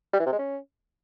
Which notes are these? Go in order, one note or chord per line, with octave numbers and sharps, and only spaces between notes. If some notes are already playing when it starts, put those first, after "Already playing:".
G3
E3
C3
G#3
C#4